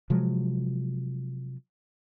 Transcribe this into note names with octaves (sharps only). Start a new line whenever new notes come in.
C3 F3 F#3 G#3